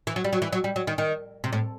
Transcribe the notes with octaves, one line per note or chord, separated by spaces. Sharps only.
E3
F#3
G3
F#3
E3
F#3
G3
F#3
D#3
D#3
C3
A2